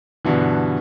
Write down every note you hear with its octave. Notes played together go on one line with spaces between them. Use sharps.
G2 B2 D3 E3